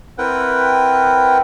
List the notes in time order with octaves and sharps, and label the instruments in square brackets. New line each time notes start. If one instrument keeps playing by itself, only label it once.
[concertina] C4 E4 A#4 B4 F#5 G5